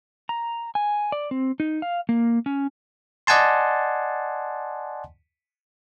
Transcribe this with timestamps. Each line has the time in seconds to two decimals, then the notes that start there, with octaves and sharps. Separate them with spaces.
0.29 A#5
0.75 G#5
1.12 D5
1.31 C4
1.60 D#4
1.82 F5
2.09 A#3
2.46 C#4
3.27 D5 D#5 F#5 G#5 A5 C6